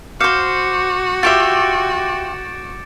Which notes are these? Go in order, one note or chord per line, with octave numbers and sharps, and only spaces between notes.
F#4 C5 F5 D6 G6 C#7
F4 G4 E5 A6 D7 E7